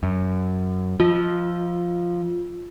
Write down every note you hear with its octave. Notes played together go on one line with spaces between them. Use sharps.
F#2
F3 F4